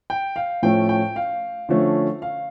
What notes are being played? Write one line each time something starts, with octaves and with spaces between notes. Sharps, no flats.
G5
F5
A2 F3 A3 C#4 G5
G5
F5
D3 F3 A3 C#4
F5